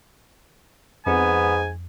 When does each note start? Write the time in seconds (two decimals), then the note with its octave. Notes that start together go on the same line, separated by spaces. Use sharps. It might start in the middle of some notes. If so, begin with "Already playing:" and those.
1.06 F2 G#2 B3 G#5